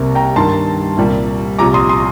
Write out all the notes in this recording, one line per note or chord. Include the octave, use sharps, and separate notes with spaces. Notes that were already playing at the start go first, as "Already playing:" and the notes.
Already playing: C2 C3 G3 A#3
G5 A#5
G2 D#3 A#3 A5 C6
C2 A#2 G3 A#3
C2 A#2 F3 A#5 D6
C6 D#6
C6 D#6